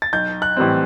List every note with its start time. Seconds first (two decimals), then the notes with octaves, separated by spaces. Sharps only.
0.02 A6
0.13 B1 G6
0.42 F#6
0.57 A2 E3 G3 C4